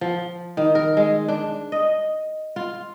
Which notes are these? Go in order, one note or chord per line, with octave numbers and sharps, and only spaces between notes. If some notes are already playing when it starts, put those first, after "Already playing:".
F3
D#3
A#4
G#3
D4
D#5
F4